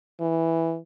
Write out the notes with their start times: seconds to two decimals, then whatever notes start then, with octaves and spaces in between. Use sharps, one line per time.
0.20 E3